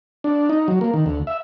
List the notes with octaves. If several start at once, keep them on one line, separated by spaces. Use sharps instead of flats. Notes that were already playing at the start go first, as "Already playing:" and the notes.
D4
D#4
F#3
A#3
D#3
D2
E5